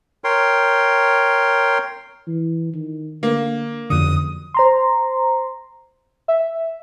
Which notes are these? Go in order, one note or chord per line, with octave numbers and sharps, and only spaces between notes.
A#4 C#5 G5 C6
E3
D#3
D3 A#3
F#1 F2 D3 D#6
C5 A#5 C6
E5